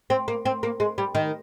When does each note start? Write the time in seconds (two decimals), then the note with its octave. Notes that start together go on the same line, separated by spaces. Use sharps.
0.10 C4
0.28 A#3
0.45 C4
0.63 A#3
0.80 G#3
0.98 G3
1.15 D#3